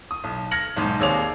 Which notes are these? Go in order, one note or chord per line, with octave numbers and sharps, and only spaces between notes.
D#6
B1
F6 G#6 A#6 C#7 F#7
B1 G#2
D#2 C3 G#4 C#5 D5 F7